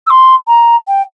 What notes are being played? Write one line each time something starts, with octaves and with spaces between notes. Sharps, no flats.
E6
C6
A#5
G5